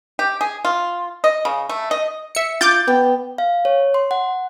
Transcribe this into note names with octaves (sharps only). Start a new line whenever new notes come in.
G4
G#4
F4
D#5
C#3
A3
D#5
E5 C#7
F4 D6 G6 A6
B3 G5
F5
C#5
C6
F#5